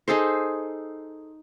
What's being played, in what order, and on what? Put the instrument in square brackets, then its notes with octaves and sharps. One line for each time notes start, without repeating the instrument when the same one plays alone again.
[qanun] D#4 G#4 A4 C5